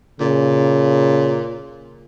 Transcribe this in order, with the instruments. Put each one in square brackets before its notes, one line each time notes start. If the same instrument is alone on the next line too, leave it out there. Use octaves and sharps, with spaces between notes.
[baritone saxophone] A#2 [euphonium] C#3